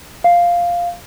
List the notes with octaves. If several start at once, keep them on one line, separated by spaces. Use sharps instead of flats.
F5